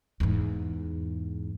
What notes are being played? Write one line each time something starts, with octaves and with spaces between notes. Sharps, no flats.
E2 G#2